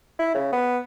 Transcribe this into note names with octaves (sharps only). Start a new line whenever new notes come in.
E4
C#3
B3